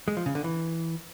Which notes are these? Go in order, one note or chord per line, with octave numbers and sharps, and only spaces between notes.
G#3
F3
C#3
D3
E3